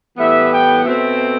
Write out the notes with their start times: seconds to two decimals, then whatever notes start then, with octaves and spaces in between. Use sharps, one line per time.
0.18 A2 E3 G3 B3 E5
0.51 G5
0.85 B2 A3 C4 E5